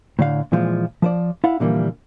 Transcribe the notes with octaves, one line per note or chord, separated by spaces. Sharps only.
A2 D3 F5
A#2 E3 F3 G#3
F3 C5 D5
E4 F5 F#5
A#2 D3 E3 F3 G3 A#3